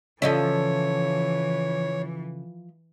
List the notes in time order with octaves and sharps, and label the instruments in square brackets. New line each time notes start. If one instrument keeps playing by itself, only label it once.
[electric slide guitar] C#3 A4 [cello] E3 [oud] F3 D#5 E5 [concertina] C#5